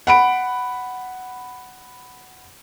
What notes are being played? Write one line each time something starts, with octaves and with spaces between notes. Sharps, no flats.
F#5 B5 D7